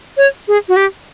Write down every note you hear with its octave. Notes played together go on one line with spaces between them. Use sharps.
C#5
G#4
F#4
G4